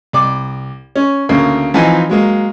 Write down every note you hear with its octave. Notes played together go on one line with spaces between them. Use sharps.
C2 D5 D6
C#4
D2 C#3 A#3
E3 F3 C4 D#4 G#5
F#3 G#3 A#3